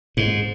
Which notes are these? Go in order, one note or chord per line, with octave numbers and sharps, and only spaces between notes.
G#2